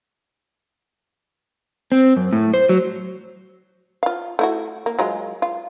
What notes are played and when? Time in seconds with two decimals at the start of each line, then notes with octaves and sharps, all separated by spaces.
1.92 C4
2.17 F#2
2.33 A2
2.54 C5
2.69 F#3
4.03 F4 F5
4.39 A3 E4 F#4
4.86 A#3
4.99 F#3 G#3 F4
5.42 F4